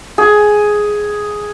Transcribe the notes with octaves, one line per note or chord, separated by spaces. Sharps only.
G#4